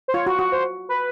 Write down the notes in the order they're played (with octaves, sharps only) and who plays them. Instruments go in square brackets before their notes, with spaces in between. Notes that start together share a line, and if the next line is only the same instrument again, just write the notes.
[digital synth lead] C5
[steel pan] F4 [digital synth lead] C#5
[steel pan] F#4
F#4
[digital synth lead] C5
B4